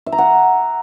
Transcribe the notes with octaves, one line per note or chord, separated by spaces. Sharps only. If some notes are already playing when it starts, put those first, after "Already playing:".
E5
A#5
F#5